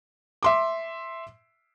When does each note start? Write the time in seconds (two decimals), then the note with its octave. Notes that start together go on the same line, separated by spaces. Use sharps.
0.43 E5 C6 D6